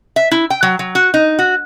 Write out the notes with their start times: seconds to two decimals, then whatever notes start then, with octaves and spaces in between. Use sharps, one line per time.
0.16 E5
0.31 E4
0.50 G5
0.63 F#3
0.79 F#3
0.95 F#4
1.14 D#4
1.39 F#4